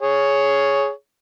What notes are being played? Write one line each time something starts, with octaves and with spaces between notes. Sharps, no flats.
G#4 C#5